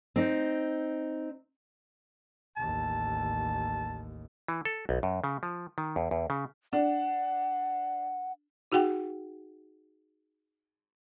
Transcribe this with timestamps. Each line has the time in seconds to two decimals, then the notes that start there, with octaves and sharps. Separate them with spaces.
0.16 C4 D#4
2.57 A1 D#2 A5
4.48 E3
4.65 A4
4.89 B1
5.03 F#2
5.24 C#3
5.43 F3
5.78 D#3
5.96 E2
6.11 E2
6.30 C#3
6.73 D4 F#5
8.72 D#4 F#4 G#4 F#5 G5